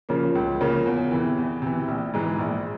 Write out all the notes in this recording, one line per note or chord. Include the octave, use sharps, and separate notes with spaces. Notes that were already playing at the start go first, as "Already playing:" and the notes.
C#3 F3 A#3 C#4
C#2
C#3 F3 A#3 C#4
E2
C3 E3
E2
C3 E3
A#1
G#2 E3 G#3
A#1